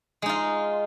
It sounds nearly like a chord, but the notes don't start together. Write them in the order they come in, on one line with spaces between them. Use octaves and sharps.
G#3 D#4 F4